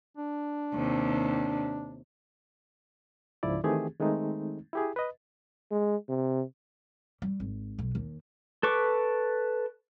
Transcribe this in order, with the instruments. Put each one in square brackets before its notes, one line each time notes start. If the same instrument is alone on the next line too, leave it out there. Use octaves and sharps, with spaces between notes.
[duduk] D4
[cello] D#2 C3
[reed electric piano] C#2 G#2 F3 E4 D5
D#3 E3 A3 C4 G4 G#4
D#3 G#3 A3 C4 D#4
E4 G4 G#4
B4 D#5
[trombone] G#3
C3
[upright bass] G3
G#1
B1
D#2
[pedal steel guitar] A4 B4 C#6 D6